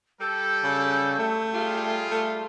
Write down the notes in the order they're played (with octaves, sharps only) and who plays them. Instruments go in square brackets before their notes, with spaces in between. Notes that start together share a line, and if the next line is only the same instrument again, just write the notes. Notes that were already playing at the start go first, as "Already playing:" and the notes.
[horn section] G3 A4 [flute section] E6 G6
[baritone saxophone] C#3
A3
[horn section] G3 F4 [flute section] G#4
[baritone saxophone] A3